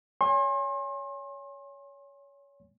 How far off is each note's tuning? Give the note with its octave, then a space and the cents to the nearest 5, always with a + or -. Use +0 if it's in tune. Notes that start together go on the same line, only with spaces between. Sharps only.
C#5 +25 G#5 -20 C6 +40